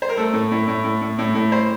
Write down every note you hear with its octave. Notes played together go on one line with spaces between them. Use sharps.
C5
A#4
A3 A4
A2
A2
A2
A2
A2
A2
A2
C5